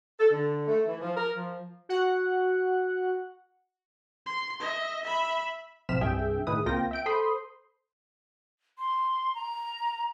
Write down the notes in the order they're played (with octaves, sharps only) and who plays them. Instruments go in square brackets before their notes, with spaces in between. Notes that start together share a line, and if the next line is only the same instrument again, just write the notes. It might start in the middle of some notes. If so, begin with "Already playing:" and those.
[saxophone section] A4
D3
A3
E3
F3
A#4
F3
[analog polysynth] F#4 F#5
[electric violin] C6
D#5 E5
E5 B5
[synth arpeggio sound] A1 C3 F3 F6 B6 E7
C2 G2 G#4 E5 G5
A2 D#3 E4 G#4 B4 D#6
C#2 A#3 C4 F4 G5 A#6
E5 G5 D7
A4 C5 B5 C6 D#6
[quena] C6
A#5